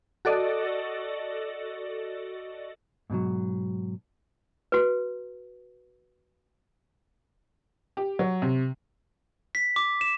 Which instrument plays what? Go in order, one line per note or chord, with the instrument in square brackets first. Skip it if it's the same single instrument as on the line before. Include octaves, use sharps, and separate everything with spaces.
[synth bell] F#4 A4 D5 D#5
[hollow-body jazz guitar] G#2 B2 D#3 F#3
[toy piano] F#4 B4
[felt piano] G4
F#3
C3
[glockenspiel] B6
D6
E7